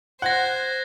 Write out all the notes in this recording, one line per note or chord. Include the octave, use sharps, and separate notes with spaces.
C5 F#5 F#6 G#6 A#6